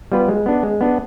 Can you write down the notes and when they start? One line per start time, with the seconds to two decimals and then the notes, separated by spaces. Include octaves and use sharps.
0.12 G3 B3 F4 B4
0.28 G#3
0.46 B3 D4
0.63 G#3
0.81 B3 D4